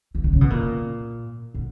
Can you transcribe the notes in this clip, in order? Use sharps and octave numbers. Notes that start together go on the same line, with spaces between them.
E3
D3
C#3
B2
A#2
B2